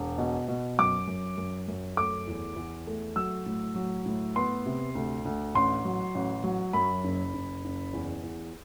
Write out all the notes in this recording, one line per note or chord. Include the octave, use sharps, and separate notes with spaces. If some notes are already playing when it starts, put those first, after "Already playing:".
Already playing: E1
B2
B2
F#2 D6
F#2
F#2
F#2
A3 D6
E2
E2
A3
F#3 E6
A2
F#3
A2
B3 C6
C3
D2
D2
A1 C6
F#3
A1
F#3
F#2 B5
F#1
F#1
F#1
E2
E2